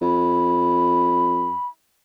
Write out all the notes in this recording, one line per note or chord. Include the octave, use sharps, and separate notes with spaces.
F2 B5